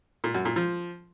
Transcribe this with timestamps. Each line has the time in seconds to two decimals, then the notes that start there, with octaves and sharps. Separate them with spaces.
0.24 A#2
0.35 F#2
0.45 A#2
0.56 F3